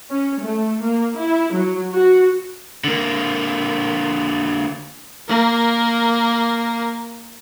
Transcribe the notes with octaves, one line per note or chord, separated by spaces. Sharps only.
C#4
A3
A#3
E4
F#3
F#4
D3 A#3
A#3 A#4